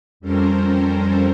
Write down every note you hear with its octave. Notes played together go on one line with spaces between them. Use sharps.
F2 G3 C#4 A4 A#4 C5